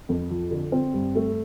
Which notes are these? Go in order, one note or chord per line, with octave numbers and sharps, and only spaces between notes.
F2
F3
D3
C4
G2
A3